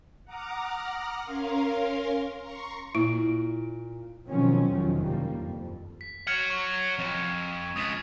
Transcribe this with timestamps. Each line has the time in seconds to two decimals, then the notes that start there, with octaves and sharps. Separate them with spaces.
0.25 F#5 A#5 D6 D#6 F6
1.22 C#4 A#4 F5 C6
2.39 A#5 C6 C#6
2.95 A#2 E4
4.27 B2 D#3 F3 F#3 C4 C#4
4.69 E2 C3 D#3 F3 F#3
5.00 F#1 F2 G3 A#3
5.39 F2
6.01 B6
6.27 C#5 F#5 F6 G#6 C#7
6.50 C#6
6.99 F2
7.76 C#2 D#6 G#6 B6